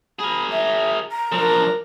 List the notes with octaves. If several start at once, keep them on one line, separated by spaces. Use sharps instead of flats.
G#4 A#4 B5
E5
A#5
F3 D4 A#4